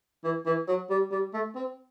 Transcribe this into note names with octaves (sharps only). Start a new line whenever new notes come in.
E3
E3
F#3
G3
G3
A3
C4